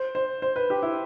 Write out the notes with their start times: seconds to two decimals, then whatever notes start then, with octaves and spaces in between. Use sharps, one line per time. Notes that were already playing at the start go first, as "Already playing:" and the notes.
Already playing: C5
0.15 C5
0.42 C5
0.56 B4
0.70 G4
0.83 E4